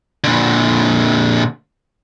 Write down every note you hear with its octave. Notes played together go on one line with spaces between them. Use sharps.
A#2 D3